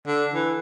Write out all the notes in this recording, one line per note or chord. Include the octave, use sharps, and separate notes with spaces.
D3
E3